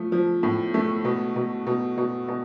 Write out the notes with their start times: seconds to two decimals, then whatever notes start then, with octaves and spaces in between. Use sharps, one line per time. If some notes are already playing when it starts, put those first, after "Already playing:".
Already playing: F3 A3
0.12 F3
0.43 A2
0.74 A3
1.05 B2
1.36 B2
1.67 B2
1.98 B2
2.28 B2